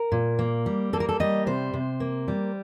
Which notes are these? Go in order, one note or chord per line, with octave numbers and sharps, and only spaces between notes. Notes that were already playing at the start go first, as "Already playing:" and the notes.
Already playing: A#4
A#2
A#3
G3
A#3 A4
A#4
A4
G3 D#5
C3 C5
C3
A#3
G3